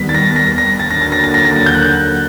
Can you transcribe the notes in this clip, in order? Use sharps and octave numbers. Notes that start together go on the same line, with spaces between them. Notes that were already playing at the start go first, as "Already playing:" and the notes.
Already playing: D#2 D#3 G3 B3 B6
A6
A#6
A#6
A#6
D#2 D3 F#3 A#3 A6
A#6
A6
A#6
A6
A#6
A6
G6
F#6